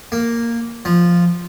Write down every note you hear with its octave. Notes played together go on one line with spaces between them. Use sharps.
A#3
F3